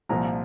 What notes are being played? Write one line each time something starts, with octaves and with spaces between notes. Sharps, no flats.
C2 A#2 F3 A#5